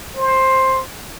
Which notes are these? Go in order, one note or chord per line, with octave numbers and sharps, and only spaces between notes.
C5